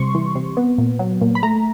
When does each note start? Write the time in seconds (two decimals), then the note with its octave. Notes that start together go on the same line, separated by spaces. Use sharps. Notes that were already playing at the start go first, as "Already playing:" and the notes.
Already playing: C3 G3 C6 C#6
0.15 E3
0.35 C3
0.57 B3
0.78 A#2
0.99 F#3
1.21 A#2
1.35 B5
1.43 A3 A#5